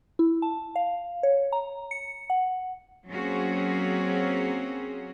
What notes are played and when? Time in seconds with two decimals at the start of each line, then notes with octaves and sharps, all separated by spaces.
0.19 E4
0.42 A5
0.76 F5
1.23 C#5
1.52 A#5
1.91 C#7
2.30 F#5
3.09 F#3 A#3 C4 C#4 F#4 G#4